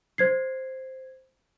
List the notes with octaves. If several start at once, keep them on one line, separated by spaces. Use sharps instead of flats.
C5 G#6 C7